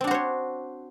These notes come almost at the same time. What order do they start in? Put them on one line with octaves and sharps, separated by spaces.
C4 D4 F#4 C5 C#5